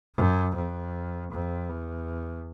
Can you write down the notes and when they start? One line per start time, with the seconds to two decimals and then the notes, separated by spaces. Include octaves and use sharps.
0.15 F#2
0.55 F2
1.32 F2
1.69 E2